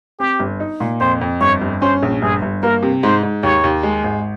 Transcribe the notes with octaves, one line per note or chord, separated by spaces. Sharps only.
C4 G4
G1
D#4
A#2
F2 C5
F2
G1 C#5
G1
C#4 C5
A#1
G1 G#4
G1
A#3 A#4
C3
G#2 C5
G#2
D#2 C#5
D#2
G#3
G#1